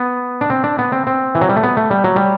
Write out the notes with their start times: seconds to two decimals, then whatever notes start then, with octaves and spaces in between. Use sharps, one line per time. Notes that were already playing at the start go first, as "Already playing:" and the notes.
Already playing: B3
0.41 D4
0.50 C4
0.64 D4
0.79 B3
0.92 C4
1.07 C4
1.35 E3
1.41 F#3
1.49 G3
1.56 A3
1.63 B3
1.77 A3
1.91 G3
2.04 F#3
2.16 G3